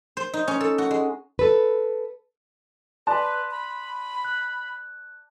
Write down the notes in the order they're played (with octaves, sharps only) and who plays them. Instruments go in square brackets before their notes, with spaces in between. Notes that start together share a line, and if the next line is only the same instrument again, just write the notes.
[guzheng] C5
D#4
C#4
A4
F#4
G#3
[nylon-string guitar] A4 B4
[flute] B4 [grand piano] D5 A5 [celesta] C6 F#6
[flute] B5
[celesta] F#6